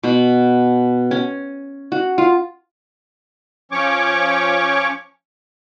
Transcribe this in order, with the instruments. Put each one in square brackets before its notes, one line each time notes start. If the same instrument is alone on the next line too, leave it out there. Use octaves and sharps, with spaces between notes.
[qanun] B2
C#4
F#4
F4
[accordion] F3 C#4 C#5 C#6 D6